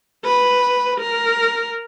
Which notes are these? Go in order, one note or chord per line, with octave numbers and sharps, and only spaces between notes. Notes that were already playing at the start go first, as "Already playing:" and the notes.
B4
A#4